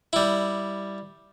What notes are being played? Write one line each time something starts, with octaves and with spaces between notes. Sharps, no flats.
G3 E4